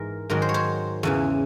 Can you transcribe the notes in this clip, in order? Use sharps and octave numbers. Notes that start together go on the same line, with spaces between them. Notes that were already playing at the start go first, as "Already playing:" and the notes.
Already playing: G#2 E3 A#4
G#2 D#3 F#3 A#4
C5
C#5
C5
E2 C#3 E3